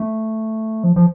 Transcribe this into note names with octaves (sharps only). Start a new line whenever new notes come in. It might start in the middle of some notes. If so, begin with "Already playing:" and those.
Already playing: A3
F3
F3